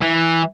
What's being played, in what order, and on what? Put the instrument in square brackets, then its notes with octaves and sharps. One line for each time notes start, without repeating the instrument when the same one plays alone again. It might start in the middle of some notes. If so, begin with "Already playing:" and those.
[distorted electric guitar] E3